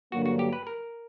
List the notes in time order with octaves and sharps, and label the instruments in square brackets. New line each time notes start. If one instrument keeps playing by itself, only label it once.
[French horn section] G2 D3 F#3 A#3 [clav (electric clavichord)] F#4
[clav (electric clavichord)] F#4
G4
B4
A#4